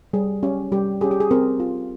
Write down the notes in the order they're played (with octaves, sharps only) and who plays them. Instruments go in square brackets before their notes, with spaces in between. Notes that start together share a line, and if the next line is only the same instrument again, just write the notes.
[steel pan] G3 G#4
C#4 G4
G3 G4
C#4 G4 G#4
G4
G#4
C4 A#4
F4